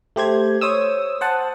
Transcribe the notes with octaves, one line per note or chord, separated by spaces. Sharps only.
A3 G4 C5 G#6
C5 C#5 D#6 E6
C5 F#5 A5